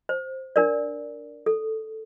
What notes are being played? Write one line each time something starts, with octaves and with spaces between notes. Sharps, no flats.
C5
D4 A#4 D5
A4